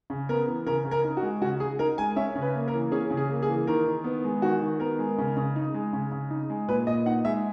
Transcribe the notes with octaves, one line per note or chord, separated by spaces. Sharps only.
C#3
B3 A#4
E3
C#3 A#4
C#3
A#4
D#4
F#4
G#3
C#3 F#4
C#3 G#4
D#4 A#4
G#3 G#5
C#4 E5
C#3
B4
A#3
A#4
E3
C#4 G#4
C#3
G#4
A#3
G#4
E3
D#3 A#4
D#3
B3
G#3
D#3 F#4
D#3
B3 A#4
G#3
C#3
C#3
D#4
G#3
C#3
C#3
D#4
G#3
A#2 B4
A#2 D#5
D#4 F#5
G#3 E5